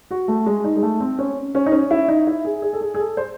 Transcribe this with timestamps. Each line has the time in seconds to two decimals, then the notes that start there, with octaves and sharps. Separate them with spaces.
0.11 F#4
0.28 A3
0.46 G#3
0.64 D#4
0.76 G#3
0.83 A3
1.00 C4
1.18 C#4
1.55 C#4
1.66 D#4
1.72 C#4
1.91 E4
2.08 D#4
2.27 E4
2.45 G#4
2.62 G#4
2.73 A4
2.81 G#4
2.94 G#4
2.99 A4
3.17 C5